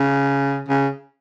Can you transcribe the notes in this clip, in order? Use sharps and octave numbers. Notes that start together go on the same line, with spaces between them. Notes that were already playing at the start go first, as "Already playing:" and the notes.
Already playing: C#3
C#3